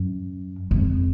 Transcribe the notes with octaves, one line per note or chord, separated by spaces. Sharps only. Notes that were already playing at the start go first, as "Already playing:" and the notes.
Already playing: F#2
F2